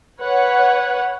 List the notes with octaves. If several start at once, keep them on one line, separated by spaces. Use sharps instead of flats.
B4 C#5 F#5